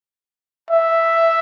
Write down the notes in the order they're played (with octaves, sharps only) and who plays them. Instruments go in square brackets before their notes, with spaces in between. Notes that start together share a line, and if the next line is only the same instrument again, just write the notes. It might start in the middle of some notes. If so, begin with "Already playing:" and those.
[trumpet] E5